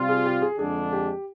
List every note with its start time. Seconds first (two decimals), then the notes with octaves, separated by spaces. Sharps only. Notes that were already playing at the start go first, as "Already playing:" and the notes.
Already playing: C3 G3 C4 F4
0.09 G#4
0.25 G4
0.42 G#4
0.59 F2 D3 G#3 D4 G#4
0.93 G4